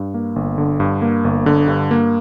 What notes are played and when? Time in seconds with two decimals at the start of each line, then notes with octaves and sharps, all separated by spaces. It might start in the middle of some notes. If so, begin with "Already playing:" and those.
Already playing: G2
0.14 A#3
0.36 G1
0.58 D3
0.80 G2
1.02 A#3
1.24 G1
1.46 D3
1.68 G2
1.91 A#3